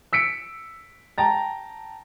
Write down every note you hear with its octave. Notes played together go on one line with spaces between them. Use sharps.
E6 B6 C#7 D7
G5 A5 A#5 A6